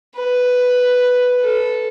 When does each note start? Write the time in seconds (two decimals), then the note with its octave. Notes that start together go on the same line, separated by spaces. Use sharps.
0.17 B4
1.42 A4